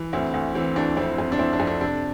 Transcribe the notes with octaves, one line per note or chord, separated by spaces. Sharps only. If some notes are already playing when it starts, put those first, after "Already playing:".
Already playing: E3
D2 C4 E4
D2
E3 C4
D2 D4
F2 C4 E4
F2
D4
F2 C4 E4
D4
F2
D4
C3 D4